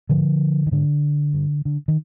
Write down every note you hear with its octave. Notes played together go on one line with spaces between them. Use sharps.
G#2 D3 F3
D#3
G#2 D3
G2
D3
D#3